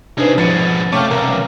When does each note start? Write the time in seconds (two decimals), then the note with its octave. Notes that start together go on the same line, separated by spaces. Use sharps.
0.17 C3 D4 D#4 G#4 B4 C5
0.38 G#2 B2 F3 A6 C#7 D#7
0.92 F#2 C3 A3 C#5 F5 G5 D6
1.11 B1 E2 A#4 F5 A#5